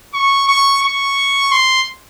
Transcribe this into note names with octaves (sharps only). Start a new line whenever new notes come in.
C#6
C#6
C#6
C6